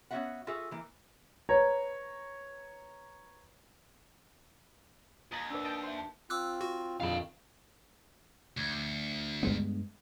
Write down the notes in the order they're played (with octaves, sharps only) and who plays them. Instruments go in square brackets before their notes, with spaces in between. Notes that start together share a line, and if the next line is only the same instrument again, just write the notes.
[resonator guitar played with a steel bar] B3 C#4 E4 F#4 E5 F#5
F4 F#4 G#4 A4 E5
E3 A#3
[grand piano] B4 C#5 A#5
[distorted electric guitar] D#2 [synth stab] D#5 B5 G#6 [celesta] A#5 A6
[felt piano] D4 A#4 B4 [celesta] D6 E6
[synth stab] D#5 G5 A5
[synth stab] C5 [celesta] E5 C6
[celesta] A5
[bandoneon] C4 F4 [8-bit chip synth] D6 E6 F#6
[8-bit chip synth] F#4
[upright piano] F2 D#3 [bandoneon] D3 [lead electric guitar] F5 B5
[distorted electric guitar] D2
[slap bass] G2 G#3 B3